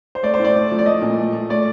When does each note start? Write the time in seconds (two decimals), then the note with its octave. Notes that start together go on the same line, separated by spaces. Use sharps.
0.15 C5
0.23 A3 D5
0.34 C5
0.39 A2 D5
0.55 A3
0.71 F3
0.79 D5
0.86 A3 D#5
1.02 A#2
1.18 A3
1.33 A3
1.50 A3 D5